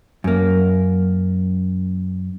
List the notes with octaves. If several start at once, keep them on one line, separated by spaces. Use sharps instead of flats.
F#2 A#3